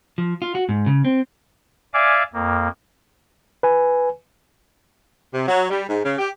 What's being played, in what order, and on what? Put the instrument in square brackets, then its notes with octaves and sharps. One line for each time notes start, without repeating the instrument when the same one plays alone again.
[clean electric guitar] F3
F4
F#4
G#2
C#3
C4
[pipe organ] D5 E5 F5 G#5 D6
F2 A#3
[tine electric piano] B4 G#5
[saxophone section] C3
F#3
G3
G#2
C#3
G4